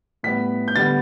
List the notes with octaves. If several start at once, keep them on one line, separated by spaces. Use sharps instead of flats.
A2 G3 B3 B6
G6
D3 G3 B3 A6